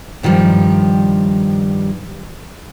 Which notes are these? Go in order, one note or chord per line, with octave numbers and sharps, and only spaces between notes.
G2 D#3 F3 G3